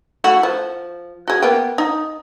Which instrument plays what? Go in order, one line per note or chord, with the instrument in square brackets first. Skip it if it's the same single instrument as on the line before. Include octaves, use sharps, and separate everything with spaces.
[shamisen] A3 E4 F#4
F3
F#4 G#4
A#3 B3 G5
D#4